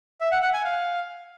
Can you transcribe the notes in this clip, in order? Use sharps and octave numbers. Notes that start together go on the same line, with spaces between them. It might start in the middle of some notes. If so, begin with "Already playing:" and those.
E5
F#5
F#5
G#5
F5